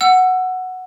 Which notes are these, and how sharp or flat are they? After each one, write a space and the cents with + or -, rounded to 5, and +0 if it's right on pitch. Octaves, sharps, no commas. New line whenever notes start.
F#5 +0 E6 +20